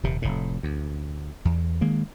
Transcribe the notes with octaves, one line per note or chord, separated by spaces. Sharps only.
D#1 D#2 C3
F1 A2
D2
E2
D#3 G#3 A#3